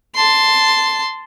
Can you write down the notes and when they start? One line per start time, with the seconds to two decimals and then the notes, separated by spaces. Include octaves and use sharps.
0.15 A5 C6